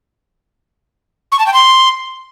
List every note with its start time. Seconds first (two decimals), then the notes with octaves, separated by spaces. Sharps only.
1.32 C#6
1.39 A5
1.46 G5
1.54 C6